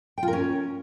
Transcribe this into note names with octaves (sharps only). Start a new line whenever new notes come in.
G5
F4
A#4
C#4